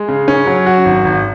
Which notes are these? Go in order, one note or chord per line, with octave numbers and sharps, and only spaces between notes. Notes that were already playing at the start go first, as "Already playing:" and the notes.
Already playing: G#3
C#3
C#4
F#3
F#4
G#1
G#1